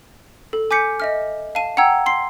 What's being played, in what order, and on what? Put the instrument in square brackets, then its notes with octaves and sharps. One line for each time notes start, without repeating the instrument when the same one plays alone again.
[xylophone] A4
G#5 D6 G6 B6 C#7
D#5 E5 F6
F5 A5 D#7
F#5 G5 A#5 E6 G#6
C6 C7